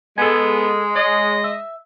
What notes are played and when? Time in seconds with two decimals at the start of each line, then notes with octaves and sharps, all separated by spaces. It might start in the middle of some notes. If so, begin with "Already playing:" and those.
0.18 G#3 B3 A4 G#5
0.96 C#5 D#5
1.44 E5